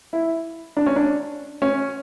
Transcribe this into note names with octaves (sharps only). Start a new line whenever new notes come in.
E4
D4
C#4
D4
C#4